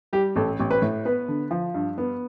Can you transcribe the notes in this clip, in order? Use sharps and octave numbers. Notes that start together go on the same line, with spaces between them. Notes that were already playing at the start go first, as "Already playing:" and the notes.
G3 G4
A1 A4
A1
B4
A2
B3 B4
D3
F3
G2
B3